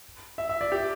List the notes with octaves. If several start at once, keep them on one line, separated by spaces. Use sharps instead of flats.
E5
E5
D5
G4